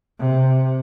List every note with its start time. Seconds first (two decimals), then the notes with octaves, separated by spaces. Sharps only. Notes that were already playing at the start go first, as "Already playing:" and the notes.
0.19 C3